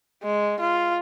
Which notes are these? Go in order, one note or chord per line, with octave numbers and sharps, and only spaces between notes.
G#3
F4